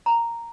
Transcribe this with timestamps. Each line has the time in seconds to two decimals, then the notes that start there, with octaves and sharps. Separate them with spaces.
0.06 A#5